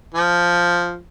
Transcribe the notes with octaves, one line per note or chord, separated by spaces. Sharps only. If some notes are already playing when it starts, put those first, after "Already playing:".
F3